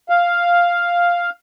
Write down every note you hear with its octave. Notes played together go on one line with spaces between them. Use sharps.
F5